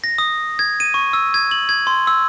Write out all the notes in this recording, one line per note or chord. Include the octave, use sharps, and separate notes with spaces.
A#6
D#6
G#6
D#7
C#6
E6
G#6
F#7
G#6
C6
E6